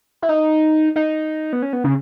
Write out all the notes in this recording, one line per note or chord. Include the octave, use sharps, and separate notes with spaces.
E4
D#4
D#4
B3
C#4
B3
C#3